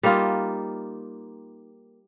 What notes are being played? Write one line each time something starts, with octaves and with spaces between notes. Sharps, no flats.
G3 A#3 D#4 F4